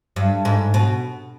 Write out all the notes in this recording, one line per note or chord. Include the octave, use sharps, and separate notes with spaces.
G2
G#2
B2